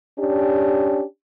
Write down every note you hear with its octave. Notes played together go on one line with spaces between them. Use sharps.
C#4 D4 G4